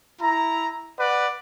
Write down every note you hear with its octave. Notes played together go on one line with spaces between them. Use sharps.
E4 A#5
B4 D5 F#5